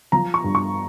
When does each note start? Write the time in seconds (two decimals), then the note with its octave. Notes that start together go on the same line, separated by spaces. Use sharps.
0.12 F3 A#5
0.34 C#6
0.44 G2
0.55 C#6